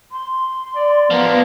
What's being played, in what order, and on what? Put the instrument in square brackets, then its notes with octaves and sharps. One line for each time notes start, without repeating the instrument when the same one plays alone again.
[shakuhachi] C6
[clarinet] D5
[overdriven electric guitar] F3 A#3 [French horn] B3